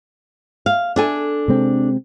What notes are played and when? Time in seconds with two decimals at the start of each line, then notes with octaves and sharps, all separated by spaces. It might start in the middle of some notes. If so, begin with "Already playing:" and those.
0.66 F5
0.96 D4 A4 G#5
1.48 C3 G#3 C4